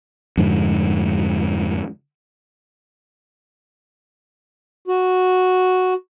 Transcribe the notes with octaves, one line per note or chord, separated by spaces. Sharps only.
F2 G#2 D3
F#4